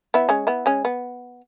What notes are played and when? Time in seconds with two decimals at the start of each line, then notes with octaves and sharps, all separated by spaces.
0.14 B3 E4
0.29 G#3 C#4
0.47 B3 E4
0.66 G#3 C#4
0.85 B3